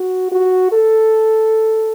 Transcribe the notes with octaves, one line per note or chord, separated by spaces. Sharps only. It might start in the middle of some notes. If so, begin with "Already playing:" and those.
Already playing: F#4
F#4
A4